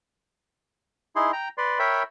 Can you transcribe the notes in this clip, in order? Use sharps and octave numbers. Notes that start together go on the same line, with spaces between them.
D#4 E4 G#4 C6
G5 A#5
B4 D5 C6
A#4 C#5 E5 G5 B5